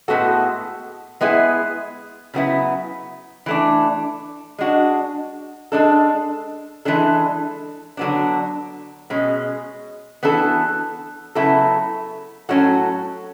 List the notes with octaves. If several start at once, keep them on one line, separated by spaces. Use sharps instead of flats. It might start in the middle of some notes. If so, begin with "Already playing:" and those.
A2 G#3 B3 F#4 A4
G#3 B3 E4 G#4
C#3 F#3 B3 E4
E3 A3 D4
G#3 D4 F#4
G#3 D4 A4
E3 G#3 D4 A4
D3 F#3 B3 D4
B2 G#3 C#4
E3 B3 D4 F#4 A4
C#3 F#3 B3 E4 A4
A2 F#3 C#4 F#4 A4